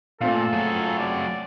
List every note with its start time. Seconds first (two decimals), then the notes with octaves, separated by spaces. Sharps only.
0.21 A#2 A3 C4 F4 A4
0.53 F#3 G#4
0.98 D5